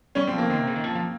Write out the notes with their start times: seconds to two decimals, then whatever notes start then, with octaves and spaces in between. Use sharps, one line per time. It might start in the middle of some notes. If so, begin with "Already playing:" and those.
0.15 G3 C#4
0.27 G3 C4
0.33 F3
0.38 A#3
0.50 D#3 C4
0.59 C3
0.67 C#3
0.76 D#3
0.84 F3
0.95 F3